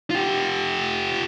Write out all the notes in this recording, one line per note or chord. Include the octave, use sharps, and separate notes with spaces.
F4 G4